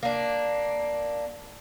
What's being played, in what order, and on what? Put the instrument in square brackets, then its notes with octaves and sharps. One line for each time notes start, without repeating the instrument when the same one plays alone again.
[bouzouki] A#3 D4